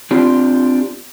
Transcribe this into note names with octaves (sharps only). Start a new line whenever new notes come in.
C4 D4 F4 G4